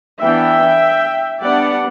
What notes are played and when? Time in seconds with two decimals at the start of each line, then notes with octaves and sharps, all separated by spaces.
0.20 E3 B3 D4 E5 G5
1.42 G3 B3 D4 D5 F#5